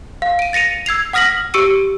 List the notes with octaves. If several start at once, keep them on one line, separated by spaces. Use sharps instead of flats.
F5
D7 D#7
A6 A#6 C#7 D#7 F7
E6 G#6 C7 F7
F#5 D#6 F6 A#6 B6 F#7
G4 C#6 E6 C#7 D#7